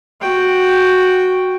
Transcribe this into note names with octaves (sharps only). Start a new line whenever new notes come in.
F#4 G5